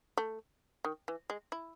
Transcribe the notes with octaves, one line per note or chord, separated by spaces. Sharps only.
A3
D#3
E3
G#3
E4